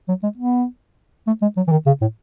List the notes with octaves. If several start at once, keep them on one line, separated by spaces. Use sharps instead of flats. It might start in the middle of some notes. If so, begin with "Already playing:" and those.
F#3
G#3
B3
A3
G#3
F#3
E3
D#3
C#3
A2